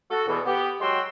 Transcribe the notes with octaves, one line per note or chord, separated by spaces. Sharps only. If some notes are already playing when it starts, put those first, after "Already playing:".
F#4 A4
E2 B2 E3
B3 G4
F#3 G#3 F#4 G5 C6 E6